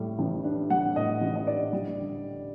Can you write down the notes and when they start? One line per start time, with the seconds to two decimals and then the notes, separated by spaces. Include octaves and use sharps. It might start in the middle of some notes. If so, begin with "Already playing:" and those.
Already playing: A2 G3
0.19 A1
0.44 D4
0.70 G3 F#5
0.96 A2 D#5
1.21 A1
1.36 D#5
1.47 D4 D5
1.73 G3
1.99 D3